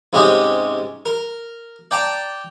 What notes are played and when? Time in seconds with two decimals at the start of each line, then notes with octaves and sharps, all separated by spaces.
0.13 G#2 C3 G#3 C#4 G4 D#6
1.06 A#4
1.91 D5 G5 A5 A#5